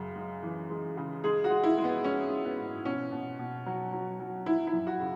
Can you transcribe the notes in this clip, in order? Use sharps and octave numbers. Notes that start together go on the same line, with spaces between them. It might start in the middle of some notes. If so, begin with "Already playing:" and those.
Already playing: F#2 C#3
G#3
E3
G#3
C#3
G#3 G#4
F#4
G#3
E4
G#3
B3
G#3 C#4
G#3
B3
G#2
B2 C#4
B2
B2
F#3
F#3
F#3
F#3 E4
E4
F#2
F#4
C#3